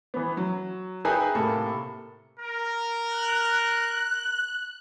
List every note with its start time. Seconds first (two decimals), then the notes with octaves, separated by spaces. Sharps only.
0.14 E3 B3
0.37 F#3
1.05 D#4 G#4 B4 E5 G5 G#5
1.35 A2 C3 A#3 A4
2.40 A#4
3.09 F#6